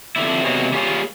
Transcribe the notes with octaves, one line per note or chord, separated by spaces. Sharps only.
F2 D3 E4
C3 F#3 G#3 A#3 B3
G3 A#3 C#4 F4 G#4 F5